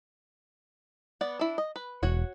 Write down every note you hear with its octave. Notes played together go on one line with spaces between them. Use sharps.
B3 D5 F#5
D4 E4
D#5
B4
E1 F#4 C#5 F#5